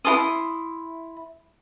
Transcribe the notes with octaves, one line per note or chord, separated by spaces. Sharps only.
E4 A4 C6 D#6